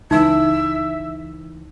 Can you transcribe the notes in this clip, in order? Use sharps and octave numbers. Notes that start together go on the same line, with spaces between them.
C#2 E3 D#4 E5 E6